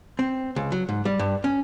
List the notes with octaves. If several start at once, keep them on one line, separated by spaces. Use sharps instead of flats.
C4
C#2
F#3
G#2
G3
G2
C#4